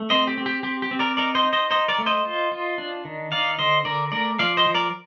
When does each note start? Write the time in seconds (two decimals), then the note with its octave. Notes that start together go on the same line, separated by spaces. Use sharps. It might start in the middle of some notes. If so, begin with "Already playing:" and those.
Already playing: A3
0.10 C4 C5 D#5
0.27 G4
0.38 C4
0.46 G4
0.63 C4 G4
0.82 G4
0.91 C4
0.99 A#4 D5
1.17 D#4 A#4 D5
1.35 C5 D#5
1.44 D#4
1.53 C5 D#5
1.70 D#4 C5 D#5
1.88 A#4 D5
1.98 A3
2.06 C5 D#5
2.25 F4
2.52 F4
2.78 D4
3.05 D#3
3.32 D#4 D5 F5
3.59 D3 C5 D#5
3.85 D3 A#4 D5
4.12 A3 A#4 D5
4.39 F3 D5 F5
4.57 C5 D#5
4.67 F3
4.74 A#4 D5